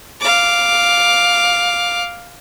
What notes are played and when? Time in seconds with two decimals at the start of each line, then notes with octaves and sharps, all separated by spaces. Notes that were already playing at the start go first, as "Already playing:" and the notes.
0.21 F5 D6